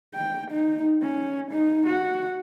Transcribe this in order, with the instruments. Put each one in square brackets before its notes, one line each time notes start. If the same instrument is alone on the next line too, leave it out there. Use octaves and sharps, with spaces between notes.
[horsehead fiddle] G5
D#4
C#4
D#4
F#4